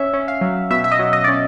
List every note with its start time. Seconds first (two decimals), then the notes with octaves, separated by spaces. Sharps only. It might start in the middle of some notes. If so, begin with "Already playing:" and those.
Already playing: C#4 E5
0.14 C#4
0.28 F5
0.41 F#3
0.70 B2 E5
0.84 E5
0.92 D#5
0.99 F#3
1.13 D#5
1.24 C#4 D5